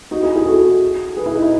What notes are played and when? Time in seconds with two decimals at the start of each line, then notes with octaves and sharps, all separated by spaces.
0.11 D#4 F#4
0.23 E4 G#4
0.35 E4 G#4
0.46 F#4 A4
1.17 G#4 B4
1.26 E4
1.35 D#4
1.42 E4